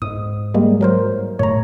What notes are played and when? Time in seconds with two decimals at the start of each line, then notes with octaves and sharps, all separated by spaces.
0.02 G#2 D#6
0.54 G3 G#3 A#3
0.81 F#3 A#4 C5
1.39 A2 C#3 A3 C#5 A#5